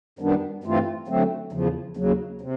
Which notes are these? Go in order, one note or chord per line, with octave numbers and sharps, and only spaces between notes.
F#2 D#3 G3 B3 D4
G2 E3 A3 C4 F4
D3 F#3 A3 C4
E2 C#3 F3
D#2 C#3 F#3
C3